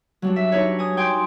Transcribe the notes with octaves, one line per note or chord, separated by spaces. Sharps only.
F#3 G3 D4
E5
D4 D#4 B4 C#5
G#5 D#6
G5 G#5 C6 D6 D#6 G6